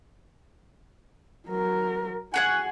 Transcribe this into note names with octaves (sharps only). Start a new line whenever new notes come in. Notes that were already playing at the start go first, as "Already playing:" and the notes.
F#3 A#4
F#4 G#4 F#5 G#5